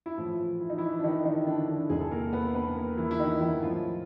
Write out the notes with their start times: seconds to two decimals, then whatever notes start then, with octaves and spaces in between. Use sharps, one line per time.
0.06 E4
0.18 A2 E3 F3 F4
0.61 E4
0.70 D#4
0.78 E3 E4
0.99 D4
1.04 D#3 D#4
1.25 D#3 D#4
1.37 D#4
1.47 D3 D4
1.68 D3 D4
1.90 E2 C3 E3 G#3 G#4
2.01 A4
2.11 A#3 A#4
2.33 B3 B4
2.55 B3 B4
2.76 A#3 A#4
2.97 E3 E4
3.11 E4
3.20 D#3 D#4
3.41 E3 E4
3.62 A2 F3 F#3 F4